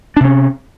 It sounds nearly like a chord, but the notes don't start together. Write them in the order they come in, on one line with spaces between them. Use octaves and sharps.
D4 C3 C#4